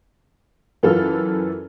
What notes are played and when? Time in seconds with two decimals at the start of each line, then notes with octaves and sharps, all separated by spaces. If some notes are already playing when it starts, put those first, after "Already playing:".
0.83 F#2 E3 E4 F4 A4 F6